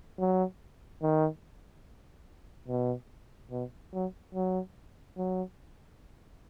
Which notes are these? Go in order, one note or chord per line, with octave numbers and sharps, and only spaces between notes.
F#3
D#3
B2
B2
F#3
F#3
F#3